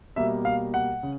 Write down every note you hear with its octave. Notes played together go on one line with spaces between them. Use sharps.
B2 G3 A#3 E5
F5
F#5
C#3